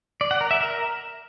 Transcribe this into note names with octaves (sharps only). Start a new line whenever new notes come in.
D5
F#5
A#4
E5
A#4